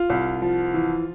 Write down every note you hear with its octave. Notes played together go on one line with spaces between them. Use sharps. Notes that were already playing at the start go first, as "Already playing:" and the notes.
Already playing: F4
C2
F3
E3